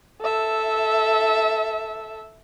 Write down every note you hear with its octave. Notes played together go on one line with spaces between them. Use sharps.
A4 E5